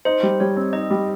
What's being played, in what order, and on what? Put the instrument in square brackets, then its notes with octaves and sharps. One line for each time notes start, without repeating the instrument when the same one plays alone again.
[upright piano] D#4 [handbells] C5
[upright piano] G3
[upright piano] G3 [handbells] C#5
[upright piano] C4
[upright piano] D#4 [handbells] D#5
[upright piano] G3